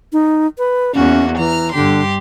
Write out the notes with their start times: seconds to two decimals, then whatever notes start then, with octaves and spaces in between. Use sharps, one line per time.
0.13 D#4
0.58 B4
0.95 E2 A#3 C#4 F#4
1.37 E3 A#5 F6
1.74 G2 D3 G4 C6